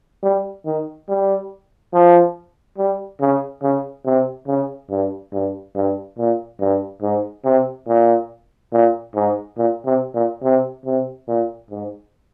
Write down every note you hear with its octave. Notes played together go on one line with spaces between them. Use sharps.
G3
D#3
G3
F3
G3
C#3
C#3
C3
C#3
G2
G2
G2
A#2
G2
G#2
C3
A#2
A#2
G#2
A#2
C3
A#2
C3
C3
A#2
G#2